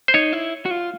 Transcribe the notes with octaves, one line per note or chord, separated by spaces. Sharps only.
C5
D#4 C#5
E4
F#4
F4